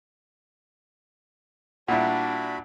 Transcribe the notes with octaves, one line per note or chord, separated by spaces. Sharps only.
A#2 G3 D4 E4 F#4 E5 F#5 B5